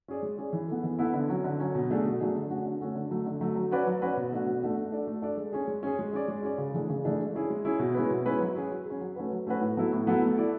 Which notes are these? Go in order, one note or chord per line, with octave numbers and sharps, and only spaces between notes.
C#4 G#4 D5
G#3
C#4 G#4 D5
E3
B3 E4 A4
E3
B3 E4 A4
D3
F#3 C#4
D3
F#3 C#4
B2
F#3 A3 D4 G#4
B2
F#3 A3 D4 G#4
D3
A3 C#4 F#4 A4
D3
A3 C#4 F#4 A4
D3
F#3 A3
D3
F#3 A3
F#3
C#4 F#4 B4 D5
F#3
C#4 F#4 B4 D5
B2
A3 D4 F#4
B2
A3 D4 F#4
A3
D4 A4 D5
A3
D4 A4 D5
G#3
C#4 G#4
G#3
C#4 G#4
G#3
C#4 G#4 D5
G#3
C#4 G#4 D5
C#3
E3 A3 D4 G#4
C#3
E3 A3 D4 G#4
G#3
C#4 E4 G#4
G#3
C#4 E4 G#4
B2
G#3 C#4 E4 B4
B2
G#3 C#4 E4 B4
F#3
C#4 G#4
F#3
C#4 G#4
F#3
A3 C#4 F#4 B4
F#3
A3 C#4 F#4 B4
A2
F#3 B3 E4 A4
A2
F#3 B3 E4 A4
A3
E4 A4 D5